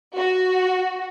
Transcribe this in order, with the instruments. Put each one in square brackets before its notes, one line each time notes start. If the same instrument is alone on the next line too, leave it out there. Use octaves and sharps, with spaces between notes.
[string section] F#4